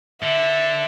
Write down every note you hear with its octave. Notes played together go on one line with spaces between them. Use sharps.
D3 E5